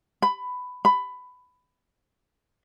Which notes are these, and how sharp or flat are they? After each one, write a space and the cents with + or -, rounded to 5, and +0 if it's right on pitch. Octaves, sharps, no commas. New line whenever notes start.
B5 +15
B5 +15